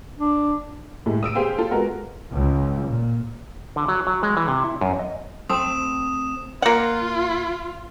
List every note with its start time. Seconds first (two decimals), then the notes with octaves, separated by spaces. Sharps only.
0.19 D4
1.06 A2 G#3 G4
1.23 D#6 E6 D7 D#7
1.35 G4 G#4 C5 F5 G5 E6
1.58 F4 A4
1.71 G#3 B3 F#4 A#4
2.32 C#2
2.86 A#2
3.76 D3
3.88 F#3
4.07 F#3
4.23 G#3
4.37 E3
4.48 C3
4.64 E4
4.81 F#2
4.99 D#5
5.50 A3 C4 D#6 E7
6.62 A#3 F4 F#5